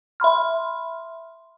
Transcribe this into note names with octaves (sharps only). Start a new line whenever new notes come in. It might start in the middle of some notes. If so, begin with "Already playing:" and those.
E5 B5 C6 F6